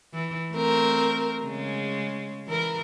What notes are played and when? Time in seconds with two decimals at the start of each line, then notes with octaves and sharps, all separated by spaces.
0.13 E3
0.51 A3 C4 A#4
1.43 C#3 G#3
2.47 E3 A#4